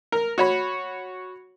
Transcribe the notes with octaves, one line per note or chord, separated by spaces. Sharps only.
A#4
F#4 C#5 B5